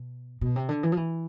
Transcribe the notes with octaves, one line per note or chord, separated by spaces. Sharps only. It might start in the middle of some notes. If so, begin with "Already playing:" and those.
Already playing: B2
B2
C3
D3
E3
F3
E3